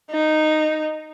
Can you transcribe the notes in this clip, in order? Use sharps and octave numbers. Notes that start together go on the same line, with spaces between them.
D#4